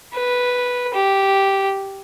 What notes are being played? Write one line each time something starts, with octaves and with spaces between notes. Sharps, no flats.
B4
G4